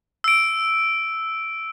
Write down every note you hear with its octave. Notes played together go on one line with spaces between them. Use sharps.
E6 D7